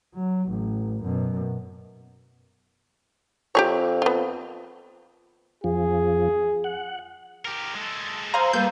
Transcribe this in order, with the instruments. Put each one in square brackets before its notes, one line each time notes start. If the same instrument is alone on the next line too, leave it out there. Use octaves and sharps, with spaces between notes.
[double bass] F#3
A1
F#2 B2
[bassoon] F2 [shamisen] G4 G#4 C#5
[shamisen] B3 F4
[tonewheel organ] F2 F3 [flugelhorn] G#4
[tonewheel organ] F#5
[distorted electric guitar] G4 A#4
G#3 A4
[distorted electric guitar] G#4 A4 [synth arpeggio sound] C5 F5 A#5
[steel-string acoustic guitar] G3 A#3 B4 [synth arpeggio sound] G6